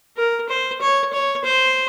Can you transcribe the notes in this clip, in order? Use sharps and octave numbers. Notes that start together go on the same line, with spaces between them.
A#4
C5
C#5
C#5
C5